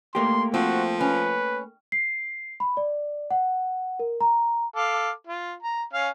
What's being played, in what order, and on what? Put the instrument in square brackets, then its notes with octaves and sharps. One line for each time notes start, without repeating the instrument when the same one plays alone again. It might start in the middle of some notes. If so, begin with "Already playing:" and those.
[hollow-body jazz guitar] A3 A#3 G4 [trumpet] C6
[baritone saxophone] F3 [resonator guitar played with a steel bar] C4 [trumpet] F#4
[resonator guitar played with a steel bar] C#4 [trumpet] B4
[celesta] C7
B5
D5
F#5
A#4
A#5
[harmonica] A4 F5 D6
F4
A#5
C#4 F5